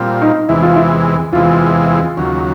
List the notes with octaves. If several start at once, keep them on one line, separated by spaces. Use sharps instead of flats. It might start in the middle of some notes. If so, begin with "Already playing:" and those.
Already playing: A#2 G3 C4 F4
D#4
E2 C3 E3 G#3 E4
F4
E4
E2 C3 E3 G#3 F4
D#2 C#3 F#3